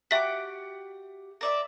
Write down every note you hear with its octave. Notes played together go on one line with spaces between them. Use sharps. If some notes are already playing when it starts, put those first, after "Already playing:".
F#4 G4 E5 D6 B6
A#4 D5 E5